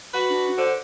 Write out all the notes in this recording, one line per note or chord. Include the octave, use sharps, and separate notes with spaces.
F#4 B4
D4
D3 C5